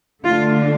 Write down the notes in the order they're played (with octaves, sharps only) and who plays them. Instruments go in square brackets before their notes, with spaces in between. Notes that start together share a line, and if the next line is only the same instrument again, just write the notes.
[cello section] D3 A3 D4 F4